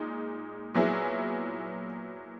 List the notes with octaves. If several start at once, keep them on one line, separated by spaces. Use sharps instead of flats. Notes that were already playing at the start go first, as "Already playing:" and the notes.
Already playing: A#2 G#3 D#4
A#2 F#3 B3 E4 G#4